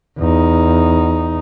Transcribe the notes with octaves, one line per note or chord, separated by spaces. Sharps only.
E2 D#4